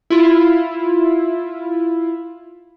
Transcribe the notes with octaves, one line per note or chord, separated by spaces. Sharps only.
E4 F4